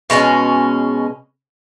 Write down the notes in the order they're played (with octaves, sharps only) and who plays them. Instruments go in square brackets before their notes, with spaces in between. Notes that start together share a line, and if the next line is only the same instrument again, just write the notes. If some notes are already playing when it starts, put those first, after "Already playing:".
[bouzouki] B2 G#3 C4 C#4